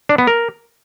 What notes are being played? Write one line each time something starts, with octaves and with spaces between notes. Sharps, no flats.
D4
B3
A#4